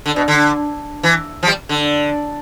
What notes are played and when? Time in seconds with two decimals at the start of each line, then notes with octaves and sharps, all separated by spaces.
0.06 D3
0.16 B2
0.28 D3
1.03 E3
1.43 F3
1.47 G3
1.69 D3